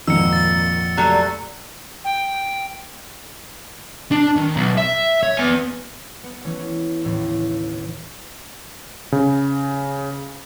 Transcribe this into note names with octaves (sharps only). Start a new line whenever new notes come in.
G#1 F2 A#2 A#3 E6 C#7
A6
F#3 G3 A3
G5
D4
D#3
B1
E5
C#5
B3 G#5
B3
E3 A3 C#4
D#2 A2 C#3 E3
C#3